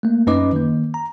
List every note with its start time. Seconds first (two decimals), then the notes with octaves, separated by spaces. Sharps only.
0.03 A3 A#3
0.27 F#2 C#4 D#4 B4 D#5 D6
0.53 D#3 A#3
0.94 A#5